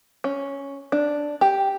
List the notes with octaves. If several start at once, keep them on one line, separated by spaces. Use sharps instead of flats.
C#4
D4
G4